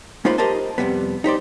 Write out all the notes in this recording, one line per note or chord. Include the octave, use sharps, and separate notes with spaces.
G#3 A#3 D#4 F4 C5 B5
G4 A#4 C5 D#5 A5
F2 C3 G3 B3
D#4 G4 C5 D5